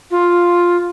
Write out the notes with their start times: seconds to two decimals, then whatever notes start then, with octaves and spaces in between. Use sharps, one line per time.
0.11 F4